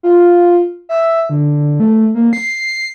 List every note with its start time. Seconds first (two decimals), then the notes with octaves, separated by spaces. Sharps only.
0.03 F4
0.89 E5
1.29 D3
1.80 A3
2.15 A#3
2.33 C7